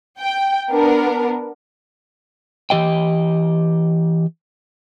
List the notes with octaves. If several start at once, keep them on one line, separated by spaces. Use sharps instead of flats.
G5
B3 D4 A#4
E3 G4 D#5 G5